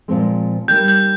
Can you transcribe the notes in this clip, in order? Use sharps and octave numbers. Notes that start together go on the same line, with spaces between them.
A#2 F3 G#3 C4
G3 A#3 D#4 G4 G6
G6